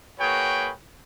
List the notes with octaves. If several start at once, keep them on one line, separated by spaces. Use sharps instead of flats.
A#3 F#4 G#4 B4 C#5 G5